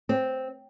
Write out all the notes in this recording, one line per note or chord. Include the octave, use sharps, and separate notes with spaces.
C4